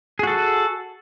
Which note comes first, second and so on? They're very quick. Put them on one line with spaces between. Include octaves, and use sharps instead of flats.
G#4 F#4 A4